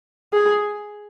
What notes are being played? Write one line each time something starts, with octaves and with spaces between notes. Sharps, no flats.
G#4